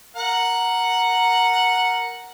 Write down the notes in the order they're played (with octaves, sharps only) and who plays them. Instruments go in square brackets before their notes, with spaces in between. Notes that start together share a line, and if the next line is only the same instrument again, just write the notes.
[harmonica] A#4 F#5